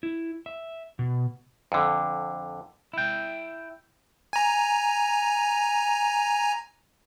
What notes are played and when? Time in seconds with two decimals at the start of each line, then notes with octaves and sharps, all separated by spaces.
0.03 E4
0.46 E5
0.99 B2
1.72 F2 D3
2.93 E4 G5
4.33 G#5 A#5